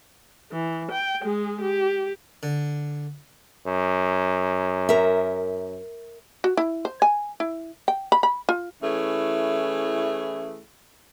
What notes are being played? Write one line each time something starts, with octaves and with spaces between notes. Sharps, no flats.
E3
G5
G#3 G#4
G4
D3
F#2
A#4 E5
F#4
E4
C5
G#5
E4
G5
B5
B5
F4
E3 A3 C#4 E4 G#4